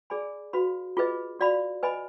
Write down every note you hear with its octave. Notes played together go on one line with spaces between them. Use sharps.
G#4 D5 G#5 B5
F#4 B4 F5 B5
F4 G#4 B4 D#5
F#4 D5 F5 B5
B4 D#5 G#5 B5